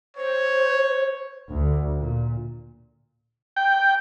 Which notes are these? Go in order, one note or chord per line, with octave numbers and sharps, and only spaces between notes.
C5 C#5
D2
A#2
G5